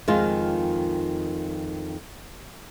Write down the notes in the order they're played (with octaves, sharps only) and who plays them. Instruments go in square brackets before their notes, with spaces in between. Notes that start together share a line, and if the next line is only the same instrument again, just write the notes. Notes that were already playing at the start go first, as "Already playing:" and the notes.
[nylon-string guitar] F2 D#3 G#3 F4